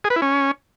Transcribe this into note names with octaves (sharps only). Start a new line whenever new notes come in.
G#4
B4
E4
C#4